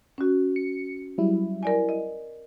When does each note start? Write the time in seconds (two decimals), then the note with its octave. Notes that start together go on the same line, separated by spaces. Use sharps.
0.18 C#4 F#4
0.56 C#7
1.18 F#3 G3 E4
1.63 A#4 D5 G#5
1.89 D#5